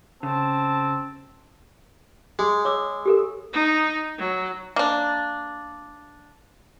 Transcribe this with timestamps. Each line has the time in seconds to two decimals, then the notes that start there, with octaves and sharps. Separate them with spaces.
0.23 C#3 C4 A5
2.39 G#3 G#4
2.65 C#5 D6 E6
3.06 G4 A4 A#4
3.53 D#4
4.19 F#3
4.76 A#3 D4